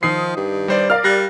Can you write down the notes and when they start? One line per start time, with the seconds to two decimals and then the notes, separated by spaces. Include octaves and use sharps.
0.03 D#3 F3 D#6 C7
0.37 G2
0.68 G3 C5 D5
0.90 A#4 D5 F5 F6
1.04 G3 F6 F#6 A#6